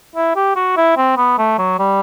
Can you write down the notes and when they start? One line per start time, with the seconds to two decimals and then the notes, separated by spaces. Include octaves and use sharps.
0.16 E4
0.36 G4
0.56 F#4
0.77 E4
0.97 C4
1.17 B3
1.38 A3
1.58 F#3
1.79 G3